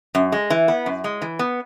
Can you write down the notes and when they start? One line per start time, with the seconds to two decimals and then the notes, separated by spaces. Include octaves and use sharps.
0.15 F#2
0.32 G#3
0.50 E3
0.68 B3
0.86 F#2
1.04 G#3
1.22 E3
1.39 B3